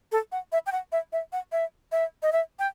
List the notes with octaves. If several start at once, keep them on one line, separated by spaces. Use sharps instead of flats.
A4
F#5
E5
G5
F#5
E5
E5
F#5
E5
E5
D#5
E5
G5